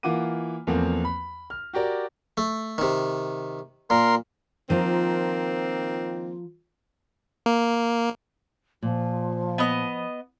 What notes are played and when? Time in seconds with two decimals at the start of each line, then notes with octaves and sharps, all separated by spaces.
0.03 E3 A#3 F4 F#5 D6 D#7
0.67 E2 F3 A3 A#3 C4
1.05 B5
1.50 F6
1.74 F#4 G4 A#4 D5
2.37 A3
2.78 C3 D#3
3.90 A#2 A#4 C6
4.70 D#3 F3 A#3 C4 F4 A#5
7.46 A#3
8.83 A#2 F3
9.58 B3 D#5